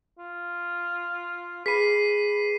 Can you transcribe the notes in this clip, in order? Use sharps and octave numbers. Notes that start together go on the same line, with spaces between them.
F4
G#4 B4 B5 B6 C7 D#7